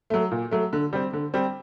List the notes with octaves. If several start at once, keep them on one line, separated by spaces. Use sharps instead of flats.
F#3 A3
A#2
F#3 A3
D3
G3 C4
D3
G3 C4